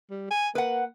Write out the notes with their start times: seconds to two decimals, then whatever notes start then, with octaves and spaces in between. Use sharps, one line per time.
0.11 G3
0.31 G#5
0.55 A#3 B4 F#5